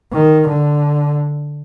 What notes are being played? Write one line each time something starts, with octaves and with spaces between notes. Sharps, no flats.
D#3
D3